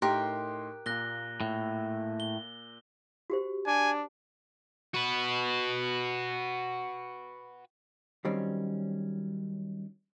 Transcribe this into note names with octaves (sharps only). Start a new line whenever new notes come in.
A2 D#4 G4 A#4 C6 F#6
A#2 A#3 F#6 A#6 G7
A2
G7
F#4 G4 C5
D4 G#5
F#4 B4
D#3 F#3 G3 C4 C#4